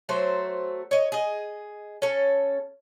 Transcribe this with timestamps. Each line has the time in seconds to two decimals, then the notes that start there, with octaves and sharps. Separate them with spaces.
0.09 F#3 A3 C5
0.91 C#5 D#5
1.12 G#4 D#5
2.02 C#4 A4